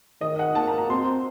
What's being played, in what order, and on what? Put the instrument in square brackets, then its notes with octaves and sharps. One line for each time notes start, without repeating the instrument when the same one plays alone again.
[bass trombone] D#3 [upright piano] D#5
[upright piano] F#5
[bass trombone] A#3 [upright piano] A5
[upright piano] A#5
A#5
[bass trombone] C4 [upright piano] C6